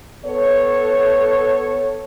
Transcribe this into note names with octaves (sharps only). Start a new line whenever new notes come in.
B3 A4 C#5